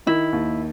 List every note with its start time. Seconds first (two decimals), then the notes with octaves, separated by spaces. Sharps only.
0.07 D#3 E4
0.32 D#2